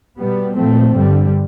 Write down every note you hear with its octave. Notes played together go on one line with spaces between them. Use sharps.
B2 G3 B3
A#2 F3 A3 C4
G2 D3 G3